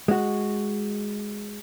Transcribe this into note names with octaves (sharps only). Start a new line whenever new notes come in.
G#3 F#4